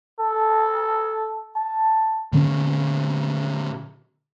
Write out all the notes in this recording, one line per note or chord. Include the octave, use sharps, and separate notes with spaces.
A4
A5
A#2 D3 C#4